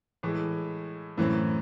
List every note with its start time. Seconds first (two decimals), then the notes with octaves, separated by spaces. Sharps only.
0.23 A2 E3 G#3
1.17 F#2 A2 E3 C4